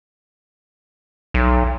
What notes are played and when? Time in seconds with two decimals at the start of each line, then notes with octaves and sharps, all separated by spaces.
1.34 B1